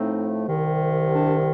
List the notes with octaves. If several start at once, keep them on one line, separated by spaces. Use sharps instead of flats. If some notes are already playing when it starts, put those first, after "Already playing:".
Already playing: A2 F3 A3 C4 D#4
C2 C3 D#3
D4